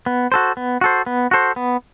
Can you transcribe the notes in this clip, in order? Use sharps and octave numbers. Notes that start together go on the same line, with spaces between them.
B3
F#4 A4 C5
B3
F#4 A4 C5
B3
F#4 A4 C5
B3